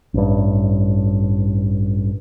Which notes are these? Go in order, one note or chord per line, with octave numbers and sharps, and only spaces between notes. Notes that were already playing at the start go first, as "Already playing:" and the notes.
A1 G2